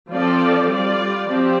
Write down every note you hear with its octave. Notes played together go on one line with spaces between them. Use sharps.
F3 C4 F4 A4 D5
G3 F4 D5
F3 C4 G4